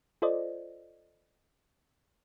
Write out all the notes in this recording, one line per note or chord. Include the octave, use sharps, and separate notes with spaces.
F4 A4 C5 D5 D#5